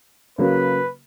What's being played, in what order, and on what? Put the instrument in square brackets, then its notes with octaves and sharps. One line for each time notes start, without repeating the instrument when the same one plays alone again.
[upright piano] C#3 F#3 A#3 [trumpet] B4